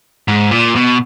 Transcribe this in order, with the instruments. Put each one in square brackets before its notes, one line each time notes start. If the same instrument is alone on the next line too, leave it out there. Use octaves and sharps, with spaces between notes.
[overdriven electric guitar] G#2
A#2
B2